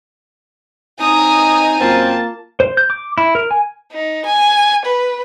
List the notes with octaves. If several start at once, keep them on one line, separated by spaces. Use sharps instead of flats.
C4 D#4 G#5 A#5 D#6
F#2 A#3 C4 F4 A5
C5
G6
D6
E4
A#4
G#5
D#4
G#5
B4